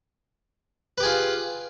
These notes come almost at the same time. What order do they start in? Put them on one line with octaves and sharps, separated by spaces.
B4 G4 G#4 F4